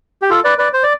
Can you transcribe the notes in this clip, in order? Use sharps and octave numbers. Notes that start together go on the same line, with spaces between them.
G4
F4 A4
B4 D5
B4 D5
C5
D5